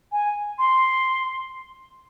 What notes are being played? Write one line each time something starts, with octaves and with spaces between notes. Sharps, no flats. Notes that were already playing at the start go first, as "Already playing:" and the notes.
G#5
C6